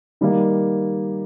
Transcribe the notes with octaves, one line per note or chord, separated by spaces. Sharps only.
D#3 G3 A#3